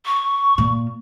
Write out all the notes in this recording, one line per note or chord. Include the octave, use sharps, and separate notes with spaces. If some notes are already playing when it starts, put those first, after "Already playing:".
C#6
A#2